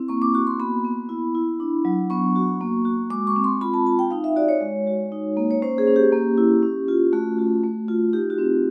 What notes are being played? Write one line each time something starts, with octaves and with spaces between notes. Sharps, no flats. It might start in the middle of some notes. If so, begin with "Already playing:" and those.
Already playing: C4 E4
A#3 C#6
D6
F#4 C#6
C6
B3 B5
B3
E4
E4
D4
F#3
B3 C#6
F#4
A#3
F#4
G#3 D6
C#6
C4
C6
F4 B5
A5
F4 A5
G5
D#4 F5
E5
F#4 D5
C#5
G#3
F#4
D#4
A#3
C#5
C#4 C5
G#4
C#4
G4
A#3
E4
C#4
F4
A3 F#4
F#4
A3
F4
D#4 G4
F#4
C4